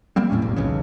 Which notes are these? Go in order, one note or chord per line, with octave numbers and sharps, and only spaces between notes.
F#3 G3 A#3 C4
E2 A2 A3 C#4
E1 A1 E2
B1 E2 C#3